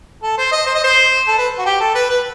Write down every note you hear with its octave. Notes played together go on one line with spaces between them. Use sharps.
A4
C5
D#5
C5
D#5
C5
A4
B4
F#4
G4
A4
B4
B4